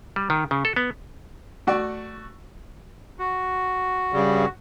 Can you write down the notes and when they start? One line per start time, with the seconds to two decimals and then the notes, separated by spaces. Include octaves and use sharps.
0.16 G3
0.30 D#3
0.51 C#3
0.65 A4
0.76 B3
1.67 A3 F#4 D5
3.19 F#4
4.13 G2 C#3 G3